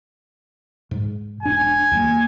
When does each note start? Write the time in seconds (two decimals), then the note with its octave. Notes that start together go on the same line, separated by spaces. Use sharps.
0.91 G#2
1.43 E1 D4 G#5
1.91 D#2 G3 A#3